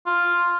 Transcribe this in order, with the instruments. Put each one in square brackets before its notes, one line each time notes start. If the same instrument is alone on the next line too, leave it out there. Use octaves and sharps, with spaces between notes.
[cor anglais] F4